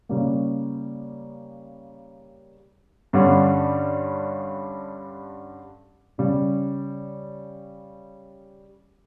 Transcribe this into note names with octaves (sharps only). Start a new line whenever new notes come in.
C#3 G3 A#3
G2 D3 G3 C#4
C#3 G3 C#4